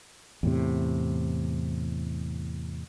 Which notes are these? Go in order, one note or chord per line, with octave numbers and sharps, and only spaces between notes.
E2 A2 C3